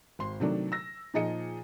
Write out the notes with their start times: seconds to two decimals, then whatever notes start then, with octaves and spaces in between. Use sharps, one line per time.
0.19 G#1 C6
0.40 C3 D#3 F#3 A3 D4
0.72 E6 A#6
1.14 A#2 F3 D#4 G#4 D#5 C#7